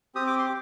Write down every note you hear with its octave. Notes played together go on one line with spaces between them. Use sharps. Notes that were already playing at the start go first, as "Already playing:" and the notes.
C4 G4 D#6
D6
C6
D6